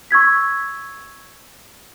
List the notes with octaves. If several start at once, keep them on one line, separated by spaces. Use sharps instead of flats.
C#6 E6 G#6 B6